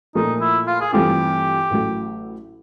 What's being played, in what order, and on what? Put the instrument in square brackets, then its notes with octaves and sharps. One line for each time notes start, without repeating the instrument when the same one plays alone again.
[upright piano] A#2 F3 A3 [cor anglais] D#4
[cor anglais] E4
F4
G#4
[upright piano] G2 E3 A3 C4 F4 [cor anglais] G4
[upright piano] A1 A2 F#3 A3